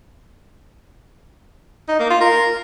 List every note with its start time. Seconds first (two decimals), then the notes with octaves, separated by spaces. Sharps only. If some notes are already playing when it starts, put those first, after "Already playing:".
1.89 D#4
1.99 A#3
2.10 F4
2.21 A#4